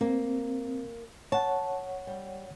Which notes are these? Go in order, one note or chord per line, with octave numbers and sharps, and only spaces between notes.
A#3 C4
C#5 F#5 A5
G3